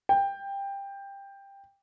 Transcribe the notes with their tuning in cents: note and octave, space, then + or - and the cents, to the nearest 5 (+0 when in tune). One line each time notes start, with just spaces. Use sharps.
G5 +15